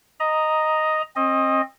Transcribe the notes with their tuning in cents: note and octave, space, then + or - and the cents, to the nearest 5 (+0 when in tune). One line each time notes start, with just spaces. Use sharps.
D#5 +0 A#5 +0
C4 +35 D#5 +0